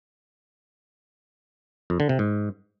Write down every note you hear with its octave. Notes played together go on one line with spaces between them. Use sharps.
F2
D3
C3
G#2